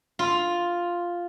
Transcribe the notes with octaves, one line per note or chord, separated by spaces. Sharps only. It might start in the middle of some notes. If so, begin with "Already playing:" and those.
F4